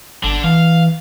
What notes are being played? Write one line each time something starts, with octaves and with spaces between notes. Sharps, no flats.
G1 D3 D4
E3 F5